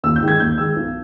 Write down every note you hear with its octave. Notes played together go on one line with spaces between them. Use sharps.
D#2 E6
G6
D#3 G#3 D#4
G#6
D#2 G6
D#3 G#3 D#4 E6
B1